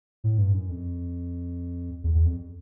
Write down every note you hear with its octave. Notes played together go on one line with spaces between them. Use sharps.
A2
G2
F#2
F2
E2
E2
F2